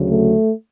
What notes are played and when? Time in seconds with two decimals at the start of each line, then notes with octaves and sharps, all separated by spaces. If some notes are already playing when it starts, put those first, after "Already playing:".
Already playing: D2 C#3 F#3
0.09 A3